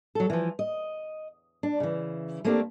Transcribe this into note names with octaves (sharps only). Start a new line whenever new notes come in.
F#3 A4
E3 F3
D#5
D4
C#3 E3
A3 A#3 C4 D4 G4